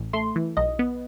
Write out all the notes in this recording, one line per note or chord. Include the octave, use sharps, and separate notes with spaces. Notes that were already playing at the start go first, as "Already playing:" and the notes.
Already playing: A1
A3 C6
E3
B1 D#5
B3